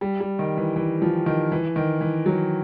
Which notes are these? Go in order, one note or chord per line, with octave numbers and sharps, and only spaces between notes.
G3
G3
D#3
E3
E3
F3
D#3
E3
D#3
E3
F#3